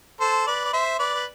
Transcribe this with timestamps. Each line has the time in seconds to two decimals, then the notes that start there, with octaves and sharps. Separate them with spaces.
0.20 A4 C5
0.47 B4 D5
0.65 D5
0.73 C5 E5
0.99 B4 D5
1.15 B4